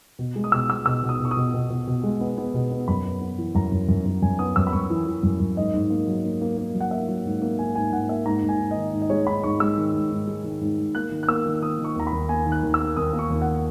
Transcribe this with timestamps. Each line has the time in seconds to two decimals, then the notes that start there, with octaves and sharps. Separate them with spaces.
0.19 B2
0.36 G#3
0.44 D#6
0.52 B2 E6
0.69 G#3 E6
0.86 B2 E6
1.03 B2
1.09 D#6
1.20 B2
1.25 C#6
1.31 D#6
1.37 B2
1.54 B2
1.70 B2
1.87 B2
2.04 G#3
2.21 B3
2.38 B3
2.54 B2
2.71 B3
2.88 F#2 B5
3.05 B3
3.21 B3
3.38 E3
3.55 F#2 A#5
3.72 F#2
3.89 F#2
4.06 F#2
4.22 F#2 G#5
4.39 B3 D#6
4.56 F#2 E6
4.67 B5
4.73 F#2 C#6
4.90 E3
5.07 E3
5.23 F#2
5.40 F#2
5.57 G#2 D#5
5.74 G#2
5.90 A#3
6.08 F#3
6.25 A#3
6.41 A#3
6.58 A#3
6.75 F#3
6.81 F#5
6.91 A#3 E5
7.08 F#3
7.25 G#2
7.42 A#3
7.59 A#3 G#5
7.75 G#2 G#5
7.92 G#2 F#5
8.09 A#3 E5
8.26 G#2 A#5
8.43 G#2
8.49 G#5
8.60 G#2
8.71 D#5
8.76 D#3
8.93 G#2
9.02 D#5
9.10 G#3 C#5
9.27 G#2 B5
9.44 G#2 C#6
9.60 G#3 E6
9.78 D#3
9.94 G#2
10.11 G#2
10.27 G#3
10.44 D#3
10.61 G#2
10.78 G#2
10.95 A#3 F#6
11.11 D#3
11.23 F#6
11.28 A#3 E6
11.46 D#3
11.62 D#3 D#6
11.79 D#3
11.84 C#6
11.96 D#2 A#5
12.07 B5
12.12 D#2
12.29 A#3 G#5
12.46 D#3
12.52 F#6
12.63 D#2
12.74 E6
12.79 A#3
12.97 D#2 D#6
13.13 A#3
13.19 C#6
13.30 D#2
13.42 F#5